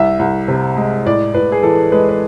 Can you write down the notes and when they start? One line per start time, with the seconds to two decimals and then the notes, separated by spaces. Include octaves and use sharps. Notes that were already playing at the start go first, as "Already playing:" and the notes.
Already playing: C2 E5
0.19 C2
0.48 C3
0.77 G#3
1.06 A2 D5
1.34 A2 B4
1.52 G#4
1.63 E3 A4
1.92 G#3 B4
2.09 B4